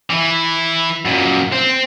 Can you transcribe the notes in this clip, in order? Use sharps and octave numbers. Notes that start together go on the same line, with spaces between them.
E3 E4
F#2 A#2
C4